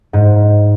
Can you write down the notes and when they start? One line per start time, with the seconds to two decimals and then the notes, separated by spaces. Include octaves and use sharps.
0.13 G#2